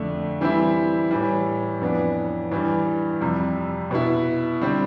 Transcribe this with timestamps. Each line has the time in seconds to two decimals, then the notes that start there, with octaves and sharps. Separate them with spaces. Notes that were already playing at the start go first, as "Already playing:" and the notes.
Already playing: F2 D3 A3 D4
0.41 E3 G3 C4 E4
1.11 A2 E3 G3
1.81 F2 E3 B3 D4
2.51 G2 E3 G3
3.21 F2 C3 G3
3.91 B2 B3 E4
4.62 D3 G3 C4